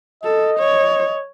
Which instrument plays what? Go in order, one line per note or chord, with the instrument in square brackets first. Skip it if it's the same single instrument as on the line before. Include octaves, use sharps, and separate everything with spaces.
[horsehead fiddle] A4 [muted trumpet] D#5
[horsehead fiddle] C#5